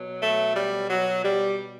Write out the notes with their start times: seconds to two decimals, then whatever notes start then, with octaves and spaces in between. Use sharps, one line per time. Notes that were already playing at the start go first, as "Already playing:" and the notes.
Already playing: B2 F#3
0.22 A3
0.56 G3
0.89 F#3
1.23 G3